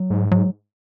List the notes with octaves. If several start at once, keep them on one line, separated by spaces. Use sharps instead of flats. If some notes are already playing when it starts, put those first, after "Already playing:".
Already playing: F#3
G#2
G#2 F#3